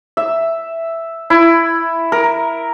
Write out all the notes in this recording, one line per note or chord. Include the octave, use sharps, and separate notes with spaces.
E5
E4
A#4